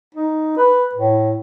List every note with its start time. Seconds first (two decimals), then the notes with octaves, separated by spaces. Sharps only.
0.15 D#4
0.57 B4
0.95 A2